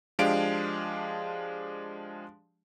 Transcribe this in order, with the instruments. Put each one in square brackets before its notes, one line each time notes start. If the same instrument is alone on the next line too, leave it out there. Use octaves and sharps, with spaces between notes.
[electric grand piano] F3 G#3 D4 G4 F5 D7